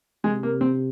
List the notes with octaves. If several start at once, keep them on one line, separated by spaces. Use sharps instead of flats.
C3 G#3
A#3
C4